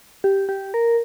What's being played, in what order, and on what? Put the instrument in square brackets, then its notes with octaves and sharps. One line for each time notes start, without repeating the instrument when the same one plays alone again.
[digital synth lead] G4
G4
A#4